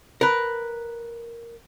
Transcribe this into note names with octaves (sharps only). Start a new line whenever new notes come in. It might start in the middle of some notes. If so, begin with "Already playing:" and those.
A#4 B4